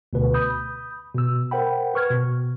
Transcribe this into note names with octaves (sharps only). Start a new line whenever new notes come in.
D2 B2 B4
B5 D#6 G6
B2 E6
A#4 C5 F#5 G5 B5
B4 C#6 F6 G#6
B2